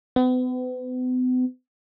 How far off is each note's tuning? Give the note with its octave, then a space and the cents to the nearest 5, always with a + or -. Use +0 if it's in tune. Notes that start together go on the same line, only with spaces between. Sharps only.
B3 +40